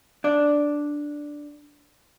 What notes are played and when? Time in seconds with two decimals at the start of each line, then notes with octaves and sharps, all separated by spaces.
0.24 D4 D5